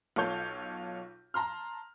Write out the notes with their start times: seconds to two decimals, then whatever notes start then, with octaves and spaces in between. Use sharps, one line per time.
0.16 B1 F4 A4 C#5 G6
1.34 A5 A#5 C6 F6